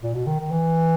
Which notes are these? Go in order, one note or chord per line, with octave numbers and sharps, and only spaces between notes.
A#2
B2
D#3
D#3
E3